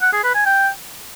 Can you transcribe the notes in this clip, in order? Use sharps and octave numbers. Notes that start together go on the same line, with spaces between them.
F#5
G#4
B4
G#5
G5